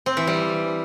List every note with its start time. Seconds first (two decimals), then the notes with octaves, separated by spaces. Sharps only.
0.06 C4
0.17 E3
0.27 G3